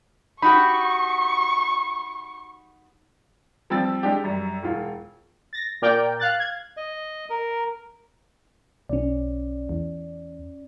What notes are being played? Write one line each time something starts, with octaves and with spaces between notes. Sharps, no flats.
D#4 F#4 G4 B5 C#6
F3 G3 C4 E6 A6
G#3 D4 G4
F#2 G3
E1 F4
A6 A#6
A#2 A#4 D5 G5
F5 F#6 A6
G#6
D#5
A#4
B1 C#4 D5
E2